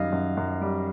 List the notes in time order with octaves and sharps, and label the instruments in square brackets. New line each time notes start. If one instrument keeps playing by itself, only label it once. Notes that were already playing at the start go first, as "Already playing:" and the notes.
Already playing: [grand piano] F#2 D#3 G3 D#5 F5
F#2
F#2
G3